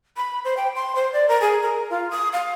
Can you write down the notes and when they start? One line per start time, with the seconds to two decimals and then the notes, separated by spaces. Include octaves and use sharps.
0.17 B5
0.45 C5
0.57 G5
0.76 C6
0.95 C5
1.13 D5
1.29 A#4
1.41 G#4
1.63 A#4
1.90 F4
2.11 D#6
2.33 F5